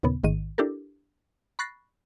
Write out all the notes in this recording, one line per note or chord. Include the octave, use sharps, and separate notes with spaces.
D#2 A#2 C#3 B3
A1 G#2 D#3 D#7
D4 E4 G4 A4 A#4
B5 C#6 F#6 A6 A#6 C7